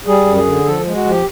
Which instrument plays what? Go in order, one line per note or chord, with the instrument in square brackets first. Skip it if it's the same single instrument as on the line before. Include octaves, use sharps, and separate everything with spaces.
[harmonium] G3 G#4
F#2
G#4
D3
F3 A4
G#3
F#4
F3 G4